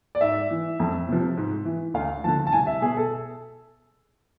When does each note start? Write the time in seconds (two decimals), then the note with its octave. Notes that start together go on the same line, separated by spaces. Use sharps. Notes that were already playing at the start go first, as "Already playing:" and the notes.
0.15 D5
0.21 G#2 E5
0.51 E3
0.80 F2
1.09 C3 F3
1.37 G#2
1.65 E3
1.94 D2 F5
2.24 D3 F3 A5
2.47 A5
2.53 C2 G#5
2.67 E5
2.81 B2 G#4
2.97 A4